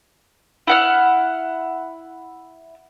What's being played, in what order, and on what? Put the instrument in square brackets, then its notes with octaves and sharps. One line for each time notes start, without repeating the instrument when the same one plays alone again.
[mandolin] E4 F#5 F6